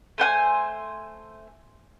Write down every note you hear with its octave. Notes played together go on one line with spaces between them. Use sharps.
A3 C5 F#5 G#5